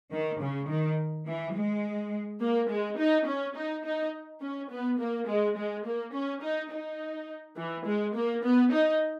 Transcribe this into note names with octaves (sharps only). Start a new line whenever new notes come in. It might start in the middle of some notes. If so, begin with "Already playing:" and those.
D#3
C#3
D#3
E3
G#3
A#3
G#3
D#4
C#4
D#4
D#4
C#4
B3
A#3
G#3
G#3
A#3
C#4
D#4
D#4
E3
G#3
A#3
B3
D#4